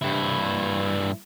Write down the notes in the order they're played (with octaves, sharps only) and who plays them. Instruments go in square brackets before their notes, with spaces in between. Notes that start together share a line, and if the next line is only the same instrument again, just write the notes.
[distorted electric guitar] G2 E4